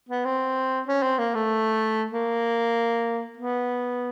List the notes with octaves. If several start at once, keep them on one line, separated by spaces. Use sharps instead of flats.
B3
C4
C#4
C4
A#3
A3
A#3
B3